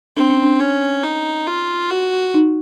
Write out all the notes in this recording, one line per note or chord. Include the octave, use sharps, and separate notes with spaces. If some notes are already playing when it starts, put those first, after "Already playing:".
C4 D4
C#4
D4
C#4
D#4
F4
F#4
D#4